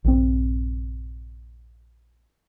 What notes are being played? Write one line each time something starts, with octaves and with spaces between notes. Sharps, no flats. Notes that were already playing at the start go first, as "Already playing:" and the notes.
A#1 G2 C4